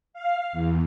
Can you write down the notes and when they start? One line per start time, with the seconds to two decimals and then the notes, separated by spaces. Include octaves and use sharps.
0.13 F5
0.53 E2